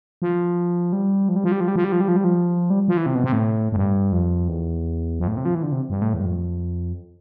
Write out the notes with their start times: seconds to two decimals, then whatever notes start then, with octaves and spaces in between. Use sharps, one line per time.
0.22 F3
0.93 G3
1.29 F3
1.36 G3
1.44 F3
1.52 G3
1.60 F3
1.68 G3
1.76 F3
1.84 G3
1.92 F3
2.01 G3
2.08 F3
2.16 G3
2.24 F3
2.70 G3
2.88 F3
2.97 E3
3.06 C3
3.15 B2
3.24 C3
3.32 A2
3.72 A2
3.76 G2
4.12 F2
4.48 E2
5.19 F2
5.27 A2
5.37 C3
5.45 F3
5.55 E3
5.63 D3
5.72 C3
5.90 G2
6.02 A2
6.14 E2
6.20 G2
6.25 F2